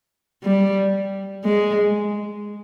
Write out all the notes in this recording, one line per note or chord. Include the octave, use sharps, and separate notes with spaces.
G3
G#3